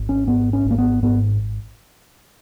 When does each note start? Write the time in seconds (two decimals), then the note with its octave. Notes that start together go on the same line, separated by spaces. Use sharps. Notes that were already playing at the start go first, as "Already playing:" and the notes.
Already playing: G#1
0.09 C#4
0.27 G#2 B3
0.53 C#4
0.65 G#1
0.71 A#3
0.78 B3
1.03 G#2 B3